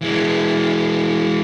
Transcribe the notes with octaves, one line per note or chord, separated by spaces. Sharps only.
E3 G#3